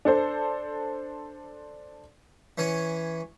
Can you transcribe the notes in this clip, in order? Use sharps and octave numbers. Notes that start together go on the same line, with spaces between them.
D4 A4 C5
E3 C#4 C#5